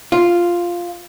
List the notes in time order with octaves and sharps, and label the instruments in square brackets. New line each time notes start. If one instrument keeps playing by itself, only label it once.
[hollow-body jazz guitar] F4